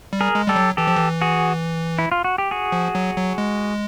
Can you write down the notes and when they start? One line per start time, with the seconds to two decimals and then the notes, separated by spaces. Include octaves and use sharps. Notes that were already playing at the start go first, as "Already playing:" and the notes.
0.13 G3
0.21 G#4 A#4
0.35 G#3
0.47 G3 G4 A4
0.56 F#3
0.77 E3 G4 A4
0.87 F3
0.96 E3
1.21 F#4 G#4
1.99 E4
2.12 F4
2.24 F#4
2.38 G4
2.51 F#4 G#4
2.72 F3
2.95 F#3
3.17 F#3
3.38 G#3